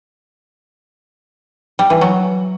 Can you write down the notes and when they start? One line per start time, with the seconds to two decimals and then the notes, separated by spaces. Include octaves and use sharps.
1.79 G3
1.90 E3
2.01 F#3